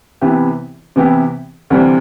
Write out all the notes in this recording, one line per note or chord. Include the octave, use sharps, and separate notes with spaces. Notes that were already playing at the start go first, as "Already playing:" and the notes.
C3 E3 B3 E4 G4
C3 E3 B3 E4 G4
D2 C3 E3 G3 C4